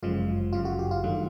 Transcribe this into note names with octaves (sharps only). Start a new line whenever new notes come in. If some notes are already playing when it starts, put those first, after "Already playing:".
G1 F#2 C#3 F3 G#3 F4
G1 F#2 C#3 F#3 F4
F#4
G4
F4
G2 D#3 F#3 A3